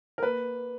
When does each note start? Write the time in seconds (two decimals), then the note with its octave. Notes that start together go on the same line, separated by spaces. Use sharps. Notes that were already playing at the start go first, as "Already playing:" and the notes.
0.18 A#4
0.22 A#3 B4